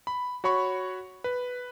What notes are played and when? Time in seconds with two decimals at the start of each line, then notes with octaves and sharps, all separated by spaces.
0.07 B5
0.44 F#4 C#5 B5 C#6
1.24 B4